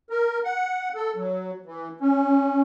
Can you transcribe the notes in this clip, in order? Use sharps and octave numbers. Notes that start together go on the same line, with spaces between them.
A#4
F#5
A4
F#3
E3
C#4